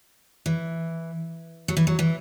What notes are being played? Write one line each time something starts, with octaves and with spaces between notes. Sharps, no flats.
E3
F#3
E3
F#3
E3